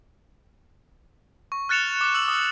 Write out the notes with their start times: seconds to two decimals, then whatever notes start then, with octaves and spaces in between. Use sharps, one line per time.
1.52 C#6
1.69 F6 F#6 A6 C#7 E7 F7
2.01 D6
2.14 E6 F#7
2.28 D#6